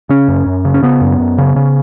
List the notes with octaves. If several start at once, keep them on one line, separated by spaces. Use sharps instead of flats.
C#3 C#4
F#2
F#2
C#3
C#4
C#3 B3
F#2
F#2
C#3
C#3